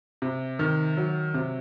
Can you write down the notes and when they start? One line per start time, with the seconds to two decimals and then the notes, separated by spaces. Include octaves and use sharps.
0.22 C3
0.59 D#3
0.97 F#3
1.34 C3